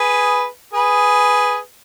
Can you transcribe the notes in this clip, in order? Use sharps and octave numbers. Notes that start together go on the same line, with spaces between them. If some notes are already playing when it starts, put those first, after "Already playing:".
Already playing: G#4 B4
G#4 B4